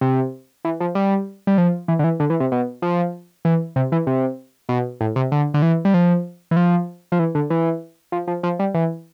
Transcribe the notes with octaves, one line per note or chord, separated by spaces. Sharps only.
C3
E3
F3
G3
G3
F3
E3
D3
E3
D3
E3
C3
B2
F3
E3
C3
E3
C3
B2
A2
C3
D3
D3
E3
G3
F3
E3
F3
F3
E3
D3
E3
F3
F3
F3
G3
E3